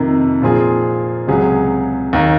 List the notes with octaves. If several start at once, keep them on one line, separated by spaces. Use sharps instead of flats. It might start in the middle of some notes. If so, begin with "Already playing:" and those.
Already playing: F2 C3 D#3 A#3
A#2 F3 C4 F4 G#4
C#2 C3 F#3 C#4 G#4
D#2 D#3 A#3